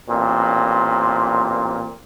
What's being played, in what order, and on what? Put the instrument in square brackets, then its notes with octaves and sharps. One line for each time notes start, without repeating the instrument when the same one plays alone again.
[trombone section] A1 A#2 C4